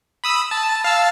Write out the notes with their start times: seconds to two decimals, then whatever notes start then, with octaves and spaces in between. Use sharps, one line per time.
0.24 B5 D#6 E6
0.51 A5
0.84 F5 A5 E6